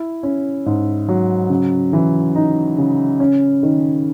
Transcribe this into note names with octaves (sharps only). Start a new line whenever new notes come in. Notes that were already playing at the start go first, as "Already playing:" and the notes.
Already playing: E4
C#4
G#2
F#3
C#3
E3
D#4
C#3
C#4
D#3